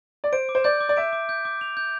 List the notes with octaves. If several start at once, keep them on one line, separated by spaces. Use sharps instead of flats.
D5
C5 D7
D6
C5
D5 G6
D6
D5
E5 D7
D6
G6
D6
F7
G6